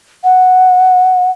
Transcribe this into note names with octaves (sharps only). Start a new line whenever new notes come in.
F#5